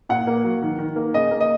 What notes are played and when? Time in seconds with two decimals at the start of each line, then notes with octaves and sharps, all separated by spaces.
0.09 A#2 F#5
0.27 A#3
0.44 F#3
0.62 D#3
0.79 D#3
0.96 A#3
1.14 C#3 D#5
1.31 A#3
1.40 D#5